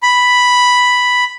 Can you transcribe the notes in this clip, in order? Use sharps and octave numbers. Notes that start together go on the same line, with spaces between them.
B5